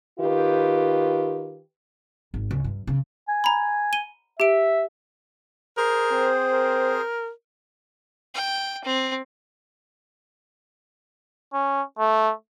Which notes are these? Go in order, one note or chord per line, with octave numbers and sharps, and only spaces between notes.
D#3 F4 G4 B4
G#1
C#2
G2
C#3
G#5
A#5 B5
D#7 G7
G4 E5 D7
G#4 A#4 C5
C4
A#4
G5
C4
C#4
A3